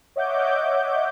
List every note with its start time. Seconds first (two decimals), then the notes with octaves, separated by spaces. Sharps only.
0.16 C#5 D#5 E5 F#5 D6 G6